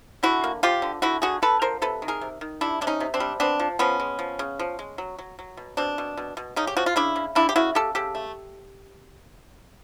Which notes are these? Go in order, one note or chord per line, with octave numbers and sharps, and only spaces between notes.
D3 E4 F#4
A#3
F3 F4 G4
D3
D3 E4 F#4
D3 F#4 G#4
D3 A4 B4
F3 A#4 C5
C3 A4 B4
D#3
G#4 A#4
C3
D#3
G3 D4 E4
C3 D4
C#4 D#4
C3
C4 D4
G3
B3 C4 D4
F3
F3 B3 C#4
G#3
F3
C#3
F3
G#3
F#3
F#3
F#3
B2
B2 C4 D4
B2
B2
B2
C#3 C#4 D#4
G4
F3 F#4
F4
C#3 D4 E4
C#3
C#3 D4 E4
G4
C#3 E4 F#4
C#3 G4 A4
C#3 G4 A4
A3